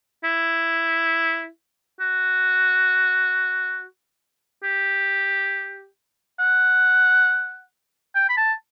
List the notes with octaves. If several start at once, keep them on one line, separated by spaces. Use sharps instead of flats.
E4
F#4
G4
F#5
G5
B5
A5